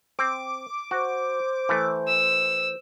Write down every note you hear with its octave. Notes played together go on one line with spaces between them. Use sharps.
C4 D6
F#4 C5
E3 A3
E6